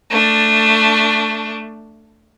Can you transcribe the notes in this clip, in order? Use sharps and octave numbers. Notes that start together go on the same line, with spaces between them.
A3 D4